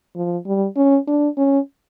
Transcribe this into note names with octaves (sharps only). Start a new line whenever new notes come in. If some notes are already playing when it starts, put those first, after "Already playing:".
F3
G3
C#4
D4
C#4